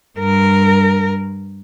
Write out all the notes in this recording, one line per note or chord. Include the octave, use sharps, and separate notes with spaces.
G2 A#4